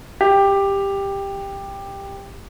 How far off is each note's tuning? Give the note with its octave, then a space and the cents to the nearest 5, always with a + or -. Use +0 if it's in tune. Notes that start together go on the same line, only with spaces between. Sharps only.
G4 +10